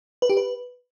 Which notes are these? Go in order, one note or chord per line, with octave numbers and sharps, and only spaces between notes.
B4
G4
B4